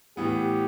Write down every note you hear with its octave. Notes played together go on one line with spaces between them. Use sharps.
A2 E3 B3 G4